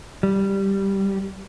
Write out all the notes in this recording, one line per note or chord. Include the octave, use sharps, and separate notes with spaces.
G3